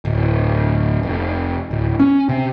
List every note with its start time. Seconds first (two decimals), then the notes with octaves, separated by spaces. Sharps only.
0.05 D1
1.03 F1
1.71 D1
1.99 C#4
2.29 C3